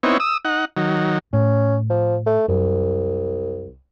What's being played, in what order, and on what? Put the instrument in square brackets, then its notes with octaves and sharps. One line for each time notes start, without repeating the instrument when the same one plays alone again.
[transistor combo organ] B3 C4 D#4 E4 C#5
D#6 E6
D#4 F#5
D#3 F#3
[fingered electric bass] A2 [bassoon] C#4
[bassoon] F3
A3
[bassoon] C2 [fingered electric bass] F#2